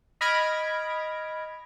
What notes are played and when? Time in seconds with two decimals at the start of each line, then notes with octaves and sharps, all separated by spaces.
0.21 D#5 B5 F6 G#6 A#6 D7